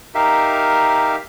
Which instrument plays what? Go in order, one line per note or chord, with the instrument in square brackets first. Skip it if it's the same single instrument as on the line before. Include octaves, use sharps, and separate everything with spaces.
[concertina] D#4 G4 A#4 E5 F5